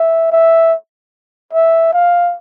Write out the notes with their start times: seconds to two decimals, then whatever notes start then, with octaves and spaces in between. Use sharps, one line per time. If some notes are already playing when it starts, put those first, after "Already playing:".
Already playing: E5
0.32 E5
1.53 E5
1.93 F5